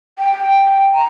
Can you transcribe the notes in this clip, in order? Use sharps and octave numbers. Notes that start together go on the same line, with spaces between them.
G5
A#5